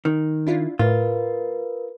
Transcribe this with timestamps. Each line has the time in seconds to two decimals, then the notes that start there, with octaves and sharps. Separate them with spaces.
0.05 D#3
0.47 D4 E4 F4
0.79 A2 F4 A#4 B4